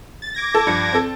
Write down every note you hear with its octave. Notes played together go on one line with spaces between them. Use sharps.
A6
D6 G#6 A#6
A4 A5
G2 F3 C#7
C4 A4